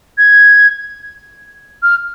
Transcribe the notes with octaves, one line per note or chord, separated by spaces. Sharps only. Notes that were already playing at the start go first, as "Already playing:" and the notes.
G#6
F6